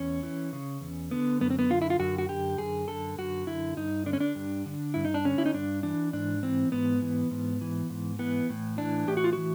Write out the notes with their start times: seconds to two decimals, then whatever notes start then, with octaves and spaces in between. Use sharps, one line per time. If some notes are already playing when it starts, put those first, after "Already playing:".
Already playing: E2 C#4
0.23 E3
0.53 C#3
0.81 E2
1.11 D3 B3
1.41 F#2 B3
1.50 C4
1.59 B3
1.70 D3 F4
1.82 E4
1.90 F4
1.99 F#2 F#4
2.18 F#4
2.29 D3 G4
2.58 F#2 G#4
2.88 D3 A4
3.18 F#2 F#4
3.47 D3 E4
3.77 G2 D#4
4.06 D3 D4
4.13 C#4
4.20 D4
4.35 G2
4.66 D3
4.94 G2 E4
5.05 D#4
5.14 D4
5.25 D3 C#4
5.38 E4
5.46 D#4
5.54 G2 D4
5.83 E3 D4
6.13 G#2 D4
6.43 E3 C4
6.72 G#2 B3
7.02 E3
7.31 G#2
7.61 E3
7.90 G#2
8.19 E3 B3
8.50 A2
8.78 E3 D4
9.07 A2 G4
9.17 F#4
9.24 F4
9.33 E3 F#4